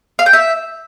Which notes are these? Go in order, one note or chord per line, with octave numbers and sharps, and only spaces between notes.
F5
G5
E5